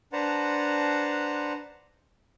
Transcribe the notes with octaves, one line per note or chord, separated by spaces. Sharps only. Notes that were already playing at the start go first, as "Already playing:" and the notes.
D4 B4 C5 F#5 A5 A#5